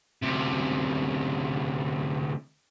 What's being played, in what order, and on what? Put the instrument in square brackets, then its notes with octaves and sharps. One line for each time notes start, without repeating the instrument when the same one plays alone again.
[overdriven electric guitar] D2 C3